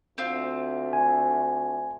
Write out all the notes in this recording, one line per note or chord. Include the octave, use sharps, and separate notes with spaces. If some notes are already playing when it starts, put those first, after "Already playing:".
D2 C4 F4
G#5